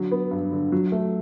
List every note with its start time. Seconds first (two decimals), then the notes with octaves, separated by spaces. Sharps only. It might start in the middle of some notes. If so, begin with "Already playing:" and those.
Already playing: D3 F#3
0.12 B3
0.31 G2
0.52 D3
0.72 F#3
0.92 A3